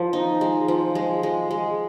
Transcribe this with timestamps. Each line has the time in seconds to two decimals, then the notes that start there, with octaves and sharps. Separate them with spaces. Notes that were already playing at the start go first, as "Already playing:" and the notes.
Already playing: F3
0.13 D#4
0.41 G#3
0.68 F3
0.95 G#3
1.23 G#3
1.51 G#3